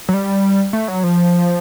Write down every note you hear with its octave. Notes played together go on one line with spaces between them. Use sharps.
F#3
G3
A3
F#3
F3